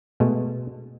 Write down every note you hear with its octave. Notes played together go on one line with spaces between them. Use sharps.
B2 G#3 A3